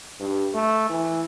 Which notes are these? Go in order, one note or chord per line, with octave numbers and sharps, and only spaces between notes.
G2
A3
E3